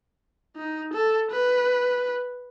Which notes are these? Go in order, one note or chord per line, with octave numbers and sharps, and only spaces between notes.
D#4
A4
B4